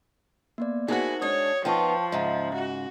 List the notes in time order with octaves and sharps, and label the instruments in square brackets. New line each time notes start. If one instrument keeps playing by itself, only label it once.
[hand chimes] A#3 B3 D5
[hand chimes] D#4 A#4 C5 [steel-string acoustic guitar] E4 G#4 [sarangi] F#4
[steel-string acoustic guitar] G#3 D4 [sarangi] C#5 [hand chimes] D#6
[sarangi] F3 [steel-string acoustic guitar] B3 D#4 F4 [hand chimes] G5 A5 C#6
[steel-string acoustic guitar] G#2 C#3 [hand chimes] D#5 E5 A#5
[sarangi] F#4